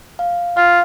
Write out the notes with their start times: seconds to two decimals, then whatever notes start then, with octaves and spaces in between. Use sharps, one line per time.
0.19 F5
0.57 F4 F5